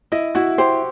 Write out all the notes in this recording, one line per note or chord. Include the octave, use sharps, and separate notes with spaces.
E4 D#5
E4 F#4
G4 C5